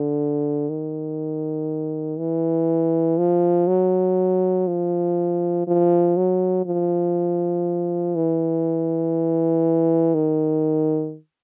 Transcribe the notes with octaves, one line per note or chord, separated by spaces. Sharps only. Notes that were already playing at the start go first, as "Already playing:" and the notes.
Already playing: D3
D#3
E3
F3
F#3
F3
F3
F#3
F3
E3
D#3